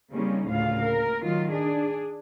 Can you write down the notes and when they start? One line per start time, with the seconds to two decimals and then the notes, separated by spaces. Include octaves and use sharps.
0.11 C#3 G3 A#3 C4 C#4 D#4
0.46 D2 A2 C#3 A#3 F4 F5
0.81 A#4
1.23 D#3 F#3 F4
1.53 D4 G#4